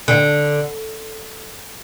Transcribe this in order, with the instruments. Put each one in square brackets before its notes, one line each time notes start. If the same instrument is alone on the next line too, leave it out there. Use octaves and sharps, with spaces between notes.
[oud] D3